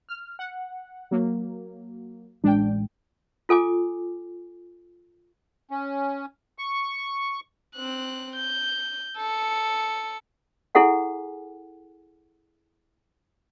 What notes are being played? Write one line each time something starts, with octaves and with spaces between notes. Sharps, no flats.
F6
F#5
F#3 A#3
A1 G#3 D4 G5
F4 A4 G#5 D6
C#4
C#6
C4 F#6
G6
A4 C#7
E4 G#4 A4 F#5 G#5